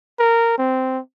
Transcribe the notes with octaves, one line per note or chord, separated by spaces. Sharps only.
A#4
C4